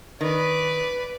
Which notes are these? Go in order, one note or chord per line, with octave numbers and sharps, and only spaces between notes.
D#3 B4 D5